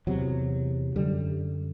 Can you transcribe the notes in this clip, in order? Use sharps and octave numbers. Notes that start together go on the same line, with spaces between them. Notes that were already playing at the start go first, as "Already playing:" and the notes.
E2 C3 F#3
F#2 D3 G3